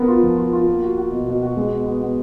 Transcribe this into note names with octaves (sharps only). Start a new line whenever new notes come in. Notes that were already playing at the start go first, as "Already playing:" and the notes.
Already playing: B3 A#4
F4
F3
F4
F4
A#3
F#4
F#4
B2
B2
F#4
G#3
B3
B3
B3